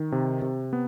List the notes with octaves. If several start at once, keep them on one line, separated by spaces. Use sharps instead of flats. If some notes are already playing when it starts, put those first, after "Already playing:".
Already playing: D#3
C3
C3
B3